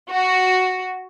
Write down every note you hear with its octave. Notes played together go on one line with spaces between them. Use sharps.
F#4